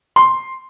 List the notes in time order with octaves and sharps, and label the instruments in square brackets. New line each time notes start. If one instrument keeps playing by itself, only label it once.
[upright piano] C6